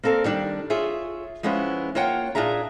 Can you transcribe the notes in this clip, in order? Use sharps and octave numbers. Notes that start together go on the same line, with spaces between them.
A#3 C4 A4 A#4 D5
D#3 G3 D4
F4 G#4 C#5 E5
F3 G#3 B3 C#4 E4
A#3 F4 C#5 F#5 G5
A#2 D4 F4 G#4 E5 A#5